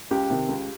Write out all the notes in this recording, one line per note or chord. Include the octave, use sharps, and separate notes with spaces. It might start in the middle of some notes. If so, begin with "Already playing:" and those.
C#2 G4
C3 D#3
C#2